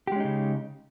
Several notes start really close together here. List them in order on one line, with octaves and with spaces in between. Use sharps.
G4 G#3 C#4 D#4 C#3